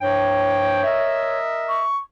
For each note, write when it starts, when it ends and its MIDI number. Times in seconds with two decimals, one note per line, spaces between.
0.01 0.81 43
0.01 0.81 53
0.01 1.36 73
0.01 0.81 79
0.84 1.84 70
0.84 1.84 75
0.84 1.84 76
1.68 1.97 85